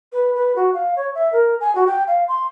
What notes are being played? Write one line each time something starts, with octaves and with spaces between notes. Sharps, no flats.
B4
B4
F#4
F5
C#5
E5
A#4
G#5
F#4
G5
F5
C6